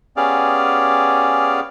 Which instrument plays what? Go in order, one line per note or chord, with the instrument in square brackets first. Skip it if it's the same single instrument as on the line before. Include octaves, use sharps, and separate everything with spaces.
[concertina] B3 C#4 G4 G#4 D5 F5